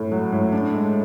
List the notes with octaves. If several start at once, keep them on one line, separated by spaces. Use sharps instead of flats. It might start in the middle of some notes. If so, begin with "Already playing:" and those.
Already playing: A2 A3
F#3
A2
D4
G#3